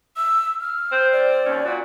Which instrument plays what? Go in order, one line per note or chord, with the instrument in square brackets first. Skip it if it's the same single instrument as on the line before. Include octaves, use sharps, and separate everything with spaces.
[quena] E6
F6
[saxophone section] C4 C5
[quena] D5
[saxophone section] D#2 C4 C#4
A#2 F#4